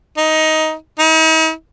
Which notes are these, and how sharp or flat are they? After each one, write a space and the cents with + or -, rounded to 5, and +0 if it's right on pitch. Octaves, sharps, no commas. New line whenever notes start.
D#4 +15
D#4 +45